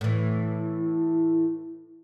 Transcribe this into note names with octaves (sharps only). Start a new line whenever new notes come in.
A2 E3